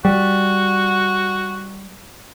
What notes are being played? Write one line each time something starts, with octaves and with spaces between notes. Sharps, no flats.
G3 F#4